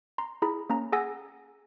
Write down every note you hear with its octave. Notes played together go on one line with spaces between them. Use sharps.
A#5 C6
E4 G#4 A#5 B5
A#3 C#4 A#5
G#4 F#5 G#5 E6 A#6